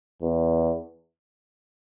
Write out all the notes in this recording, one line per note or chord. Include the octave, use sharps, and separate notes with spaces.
E2